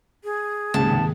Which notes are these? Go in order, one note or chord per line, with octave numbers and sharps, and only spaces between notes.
G#4
D#1 C#2 G#2 C3 D#3 A5